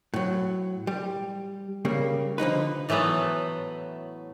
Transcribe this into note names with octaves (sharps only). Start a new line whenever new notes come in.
A2 F#3
G3
C#3 G3 A#3
D3 F3 D#4 B4
A2 E3 F#3 A3 B3